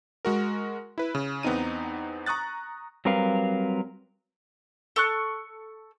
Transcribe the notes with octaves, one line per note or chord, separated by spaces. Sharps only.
G#3 F#4 A#4
E4 B4
C#3
E2 B3 C4 D#4 D#7
A#5 C#6 D#6 F#6 A6
F#3 G3 C4 A#4 B4 F5
A4 C#6 F#6